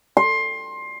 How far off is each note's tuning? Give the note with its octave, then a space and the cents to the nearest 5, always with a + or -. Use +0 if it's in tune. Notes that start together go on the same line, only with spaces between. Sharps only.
C6 +20